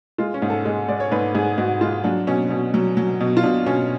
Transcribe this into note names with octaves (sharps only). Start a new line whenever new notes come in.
G#3 F4
C#4
G#2
A4
G#3
G#3 D5
C#5
G#2 B4
G#2 G#4
G#2 F#4
G#3 F4
F#3 D4
B2 C#4
B2
F#3
F#3
B2
F4
B2 D4
B2 C#4